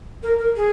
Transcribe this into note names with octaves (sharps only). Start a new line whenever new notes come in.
A#4
A#4
G#4